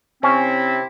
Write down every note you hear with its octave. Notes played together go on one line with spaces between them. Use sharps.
C3 C4 C#4 E4